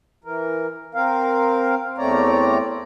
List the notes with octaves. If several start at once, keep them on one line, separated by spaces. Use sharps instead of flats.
E3 A#4
C4 A#4 F5
E2 A3 C4 C#5 D5 A#5